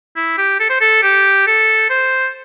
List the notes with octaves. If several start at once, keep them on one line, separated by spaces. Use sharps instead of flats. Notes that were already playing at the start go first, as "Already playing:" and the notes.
E4
G4
A4
C5
A4
G4
A4
C5